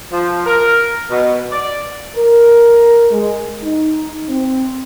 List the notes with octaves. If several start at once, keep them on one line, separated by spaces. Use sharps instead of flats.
F3
A#4
B2
D5
A#4
G#3
D#4
C4